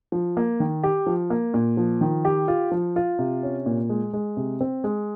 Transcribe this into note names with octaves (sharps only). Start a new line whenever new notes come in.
F3
A#3
D#3
G4
F3
A#3
A#2
F3
D#3
G4
F4
F3
F4
C3
C#4
A#2
G#3
G#3
C3
C4
G#3